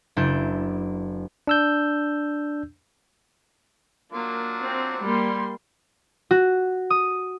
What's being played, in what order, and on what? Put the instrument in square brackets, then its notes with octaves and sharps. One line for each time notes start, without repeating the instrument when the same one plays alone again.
[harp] F#1 D4 E4 G6
[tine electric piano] D4 E6 G6
[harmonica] F#3 D4 F4 [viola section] A#3
[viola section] C4
G3 A#3 C6
[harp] F#4
D#6